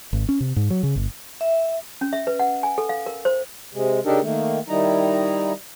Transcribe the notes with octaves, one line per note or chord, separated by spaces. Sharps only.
G#1
C#4
C3
G#2
F#3
C#3
G1
E5
C#4
E5
B4
F#5
G#5
A4
F5
A#4
C5
C3 G#3
C#3 D4 D#4 G4 A4 A#4
D#3 A3 A#3
D#3 G3 D#4 E4 A#5